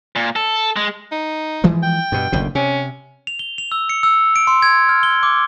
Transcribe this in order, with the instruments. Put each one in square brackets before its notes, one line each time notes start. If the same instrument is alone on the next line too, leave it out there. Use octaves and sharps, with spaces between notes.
[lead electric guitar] A#2
A4
G#3
[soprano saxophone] D#4
[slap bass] E3 F3 G#3
[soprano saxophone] G5
[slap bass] G2 B2
F#1 D2 B2
[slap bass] C3 [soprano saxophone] C#4
[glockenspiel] F7
G7
F7
E6
C#7
E6
D7
C6
G#6
F6
G7
D6